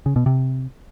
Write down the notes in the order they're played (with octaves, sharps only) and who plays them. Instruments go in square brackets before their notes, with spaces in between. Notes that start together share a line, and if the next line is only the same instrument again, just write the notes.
[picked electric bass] C#3
B2
C3